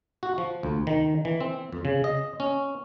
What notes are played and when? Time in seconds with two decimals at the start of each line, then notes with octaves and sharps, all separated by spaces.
0.23 F#4
0.38 F3
0.63 D2
0.87 D#3
1.25 E3
1.41 C4
1.72 F2
1.85 C#3
2.04 D#5
2.40 C#4